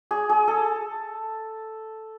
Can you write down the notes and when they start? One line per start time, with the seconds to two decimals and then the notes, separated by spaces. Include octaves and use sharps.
0.11 G#4
0.29 G#4
0.48 A4